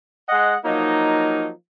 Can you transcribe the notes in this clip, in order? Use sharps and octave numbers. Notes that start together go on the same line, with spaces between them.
G#3 D#5 F#5
F3 F#3 A#3 D#4